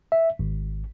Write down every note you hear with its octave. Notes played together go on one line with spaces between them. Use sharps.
E5
G#1